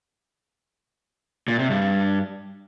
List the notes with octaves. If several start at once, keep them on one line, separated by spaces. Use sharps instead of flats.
A#2
C3
G2